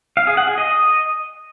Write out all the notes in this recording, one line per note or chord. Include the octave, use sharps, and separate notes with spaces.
F5
G#4
F#5
G#4
D#5